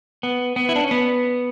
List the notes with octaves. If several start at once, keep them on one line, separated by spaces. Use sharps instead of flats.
B3
B3
E4
D4
C#4
B3